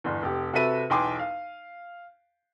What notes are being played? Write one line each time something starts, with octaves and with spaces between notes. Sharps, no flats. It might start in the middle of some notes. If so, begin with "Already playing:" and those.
G1 E2
F1 G4
C3 F#4 A4 B4 E5 D#7
B1 E2 G5 G#5 C6 D6
F5